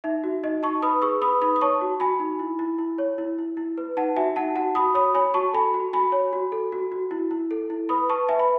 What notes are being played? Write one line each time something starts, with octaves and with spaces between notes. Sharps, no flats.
D#4 E5
F#4
D#4 D#5
D#4 A5 C#6
B4 B5 D#6
G#4 C#6 E6
B4 B5 D#6
D#4 B5 D#6
D#6
C#5 A5 C#6
F#4
F#4 G#5 B5
D#4
E4
E4
E4
C#5
E4
E4
E4
B4
D#4 F#5 A5
F#4 E5 G#5
D#4 F#5 A5
F#4 F#5 A5
F#4 B5 D#6
C#5 B5 D#6
C#5 G#5 B5
F#4 A5 C#6
A4 G#5 B5
F#4
F#4 G#5 B5
C#5
F#4
A4
F#4
F#4
E4
E4
A4
E4
B4 B5 D#6
B4 A5 C#6
B4 E5 G#5
B5